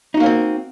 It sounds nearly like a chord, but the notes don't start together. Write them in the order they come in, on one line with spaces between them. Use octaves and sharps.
D#4 F#4 A#3 C#4 C4